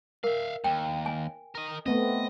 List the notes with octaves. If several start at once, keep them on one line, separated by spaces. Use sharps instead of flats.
A#4 E5 F5
D#2 G5
G#5
A#4 D#5
A3 B3 C4 D#5